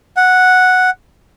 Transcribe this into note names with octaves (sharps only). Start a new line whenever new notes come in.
F#5